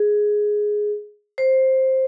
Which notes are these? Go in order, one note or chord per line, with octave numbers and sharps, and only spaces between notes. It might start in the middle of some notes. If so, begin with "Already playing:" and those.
Already playing: G#4
C5